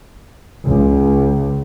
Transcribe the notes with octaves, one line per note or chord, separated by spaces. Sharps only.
C#2